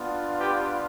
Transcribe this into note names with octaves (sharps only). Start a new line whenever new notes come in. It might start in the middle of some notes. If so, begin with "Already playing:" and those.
Already playing: B3 D4 F4
G4 B4